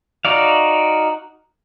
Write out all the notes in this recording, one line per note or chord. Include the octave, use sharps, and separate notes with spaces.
D#4 F#4 D5 F5